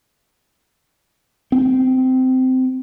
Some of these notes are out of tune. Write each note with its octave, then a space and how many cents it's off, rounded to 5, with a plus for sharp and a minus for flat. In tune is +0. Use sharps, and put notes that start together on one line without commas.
C4 -20